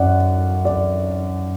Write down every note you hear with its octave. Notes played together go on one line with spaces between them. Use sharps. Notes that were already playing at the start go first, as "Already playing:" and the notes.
Already playing: F#2 D5 F#5
D5